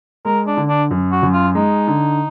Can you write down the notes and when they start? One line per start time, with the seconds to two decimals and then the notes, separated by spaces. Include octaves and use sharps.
0.25 G#3 A#4
0.47 D4
0.57 D3
0.68 D4
0.91 F#2
1.12 F#4
1.23 F#2
1.33 F4
1.55 G#3 D#4
1.88 D3